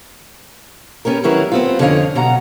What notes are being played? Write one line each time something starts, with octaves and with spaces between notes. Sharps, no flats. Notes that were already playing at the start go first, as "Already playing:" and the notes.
B3 C#4 G4 A#4
D#3 F#3 C#4 E4 A#4 B4
B3 C4 F4
F2 D3 C#4 C#5 D#5 F5
B2 F#3 F#5 A#5